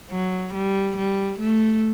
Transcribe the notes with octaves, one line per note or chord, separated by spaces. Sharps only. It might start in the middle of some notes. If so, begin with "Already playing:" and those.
F#3
G3
G3
A3